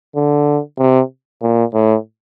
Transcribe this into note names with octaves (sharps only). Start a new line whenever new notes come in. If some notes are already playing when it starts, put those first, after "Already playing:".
D3
C3
A#2
A2